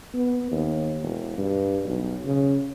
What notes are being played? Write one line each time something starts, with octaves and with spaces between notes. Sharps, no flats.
B3
D#2
E1
G2
B1
C#3